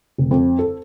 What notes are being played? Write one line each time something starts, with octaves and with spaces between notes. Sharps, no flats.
F1
F2
A4